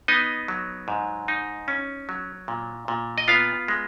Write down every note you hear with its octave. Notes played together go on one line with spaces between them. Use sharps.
B3 D#4 D#5
F#3
G#2
D#4
C#4
F#3
A#2
A#2
D#5
B3 F4 F5
G#3